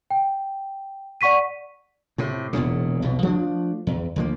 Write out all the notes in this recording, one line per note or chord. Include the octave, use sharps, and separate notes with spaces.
G5
D5 F#5 C#6 B6 D#7
A2 C3
E1 E2 A#2 C#3
B1 F2 B2
F3 A3 C#4 D4
E2
D2 F3 A#3